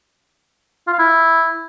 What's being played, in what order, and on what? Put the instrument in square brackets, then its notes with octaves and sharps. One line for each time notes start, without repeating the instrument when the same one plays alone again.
[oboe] F4
F5
E4